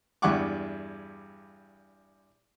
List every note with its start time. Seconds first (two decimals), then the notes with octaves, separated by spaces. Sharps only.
0.22 E2 G2 E4 F#5 C#6 D6